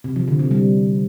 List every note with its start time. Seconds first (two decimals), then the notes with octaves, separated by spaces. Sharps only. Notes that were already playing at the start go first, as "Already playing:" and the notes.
0.04 C3
0.16 F3
0.28 D3
0.39 C3
0.51 G3